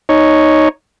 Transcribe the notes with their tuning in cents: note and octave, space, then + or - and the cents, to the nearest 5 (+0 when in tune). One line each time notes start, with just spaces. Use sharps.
D#4 +0 C#5 +0